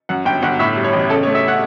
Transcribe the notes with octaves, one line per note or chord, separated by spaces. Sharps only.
F#2 F#5
G1 G5
G1 F#5
A2 E5
G3
C#5
A1
C#3 A4
C#5
A3
E5
F#5